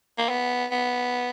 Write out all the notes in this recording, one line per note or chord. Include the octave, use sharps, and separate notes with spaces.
A#3
B3
B3